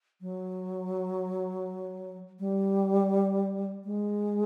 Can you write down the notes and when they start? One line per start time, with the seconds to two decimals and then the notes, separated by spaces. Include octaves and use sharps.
0.21 F#3
2.39 G3
3.85 G#3